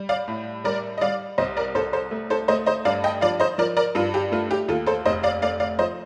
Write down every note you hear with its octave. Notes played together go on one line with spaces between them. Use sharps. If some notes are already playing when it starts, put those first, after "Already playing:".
Already playing: G3
D5 F5
A2
G3 A#4 D5
D#5
G3 D5 F5
C2 C5 D#5
A#4 D5
C2 A4 C5
A4 C5
A3
A4 C5
A3 C5 D#5
C5 D#5
G2 D5 F5
D#5 G5
F3 D5 F5
C5 D#5
F3 A#4 D5
A#4 D5
G2 F4
G4
A3 F4
G4
D#2 F4 A4
A4 C5
F1 C5 D#5
D5 F5
A3 D5 F5
D5 F5
F3 C5 D#5